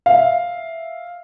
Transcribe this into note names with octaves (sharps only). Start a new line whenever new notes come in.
E5 F5